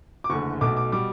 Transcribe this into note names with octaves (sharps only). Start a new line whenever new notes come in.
D6
F#1 E2 D3 A3 C#6
B1 B2 A3 D6
D6
B2 G3 D6